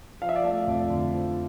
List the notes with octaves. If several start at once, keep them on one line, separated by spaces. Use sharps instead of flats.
F3 F5
E5
D5
A3 E5
F2
D3
F3